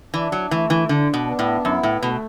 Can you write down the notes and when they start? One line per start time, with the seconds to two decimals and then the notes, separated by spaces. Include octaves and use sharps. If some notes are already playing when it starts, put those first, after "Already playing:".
0.13 E3 D4
0.32 F#3
0.51 E3 A3
0.70 E3
0.89 D3 D4
1.14 B2
1.27 B3
1.39 A2
1.65 F#2 E4
1.83 A2
2.02 B2 A3